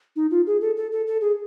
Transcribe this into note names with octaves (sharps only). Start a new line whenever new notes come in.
D#4
F4
G#4
A4
A4
A4
A4
G#4